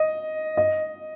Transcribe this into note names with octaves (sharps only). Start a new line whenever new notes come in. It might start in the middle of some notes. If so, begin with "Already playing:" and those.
Already playing: D#5
D#5